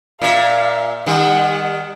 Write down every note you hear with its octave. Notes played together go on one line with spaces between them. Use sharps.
A#2 E5 F5
D#3 G3 F#5